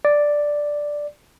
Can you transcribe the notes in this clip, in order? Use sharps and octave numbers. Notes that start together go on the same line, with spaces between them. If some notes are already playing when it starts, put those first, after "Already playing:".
D5